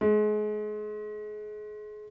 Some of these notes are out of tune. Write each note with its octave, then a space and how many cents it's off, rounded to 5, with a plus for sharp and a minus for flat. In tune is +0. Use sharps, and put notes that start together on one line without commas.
G#3 +30